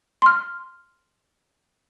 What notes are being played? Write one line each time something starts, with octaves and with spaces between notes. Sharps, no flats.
C6 F6